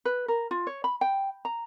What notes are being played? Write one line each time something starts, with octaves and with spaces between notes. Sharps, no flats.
B4
A#4
F4
C#5
B5
G5
A#5